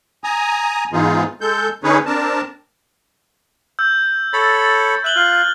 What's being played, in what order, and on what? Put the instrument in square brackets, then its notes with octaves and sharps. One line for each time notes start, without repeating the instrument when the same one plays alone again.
[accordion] G#5 A#5 D#6
G#2 E3 B3 D#4 F4 G#4
G#3 A4 G6
D3 C#4 D#4 G#4 B4 C#5
C4 D4 A#4 A5
[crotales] E6 G6
[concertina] A4 C#5 B5 [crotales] A6
[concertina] E5 [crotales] F#6 F#7 G7
[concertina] F4 [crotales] F6